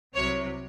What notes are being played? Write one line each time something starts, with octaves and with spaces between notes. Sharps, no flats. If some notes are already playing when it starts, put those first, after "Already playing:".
C2 C3 F#3 C#5